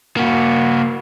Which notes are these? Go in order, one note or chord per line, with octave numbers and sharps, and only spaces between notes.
A#3 F#4